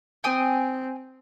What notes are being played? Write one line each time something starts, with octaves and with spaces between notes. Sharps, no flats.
C4 G5 G#5 D#6